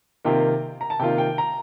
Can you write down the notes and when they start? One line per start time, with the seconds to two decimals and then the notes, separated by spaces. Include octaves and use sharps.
0.25 C3 D#3 A#3 F4 G5
0.81 A#5
0.90 A5
0.99 C3 D#3 A#3 F4 G5
1.18 G5
1.38 A#5